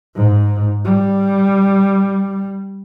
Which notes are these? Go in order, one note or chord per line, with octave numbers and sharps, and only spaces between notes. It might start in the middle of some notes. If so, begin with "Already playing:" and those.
G#2
G3